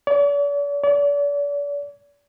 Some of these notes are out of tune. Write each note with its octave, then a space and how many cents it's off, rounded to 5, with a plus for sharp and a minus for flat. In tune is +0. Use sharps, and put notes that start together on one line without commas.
D5 -45
D5 -40